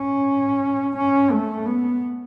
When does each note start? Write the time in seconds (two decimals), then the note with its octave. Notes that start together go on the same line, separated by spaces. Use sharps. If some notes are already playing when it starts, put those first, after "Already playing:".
Already playing: C#4
0.97 C#4
1.31 A3
1.66 B3